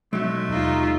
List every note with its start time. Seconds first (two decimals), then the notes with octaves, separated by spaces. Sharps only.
0.13 B1 F#3 G#3 A3
0.49 D#2 D#4 F4